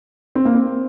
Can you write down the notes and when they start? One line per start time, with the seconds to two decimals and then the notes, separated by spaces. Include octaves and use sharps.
0.35 C4
0.45 A#3
0.54 C4